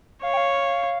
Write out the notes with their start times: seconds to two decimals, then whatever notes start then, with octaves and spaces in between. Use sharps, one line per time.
0.23 C#5 F5
0.34 G5
0.37 F5